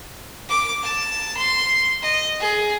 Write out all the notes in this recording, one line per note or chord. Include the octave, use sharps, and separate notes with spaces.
D6
A5
C6
D#5
G#4